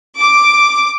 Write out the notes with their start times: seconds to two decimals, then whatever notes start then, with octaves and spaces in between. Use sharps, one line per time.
0.20 D6